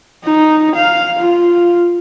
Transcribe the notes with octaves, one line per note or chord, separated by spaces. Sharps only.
D#4
F5
F4